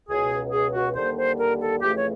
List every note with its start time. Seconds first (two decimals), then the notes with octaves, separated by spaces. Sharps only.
0.09 C#2 B2 F#3 G#4
0.52 G#4
0.74 F#4
0.95 D#2 D3 G3 A#3 C5
1.17 C5
1.38 A#4
1.60 A4
1.81 F2 C#3 E3 A3 G4
1.96 C#5